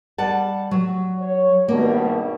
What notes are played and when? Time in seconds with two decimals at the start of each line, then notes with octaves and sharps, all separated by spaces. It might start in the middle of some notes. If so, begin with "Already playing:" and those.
0.18 G3 F#5 A5
0.71 F#3
1.20 C#5
1.68 G#1 G2 B2 A#3